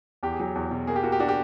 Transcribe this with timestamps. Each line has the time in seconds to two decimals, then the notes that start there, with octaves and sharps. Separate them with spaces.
0.23 E2 G4
0.32 G#4
0.40 F#3 G4
0.55 E2
0.71 B2
0.87 A#3 G#4
0.96 G4
1.03 A#3 F#4
1.12 G4
1.20 D4 F#4
1.28 G4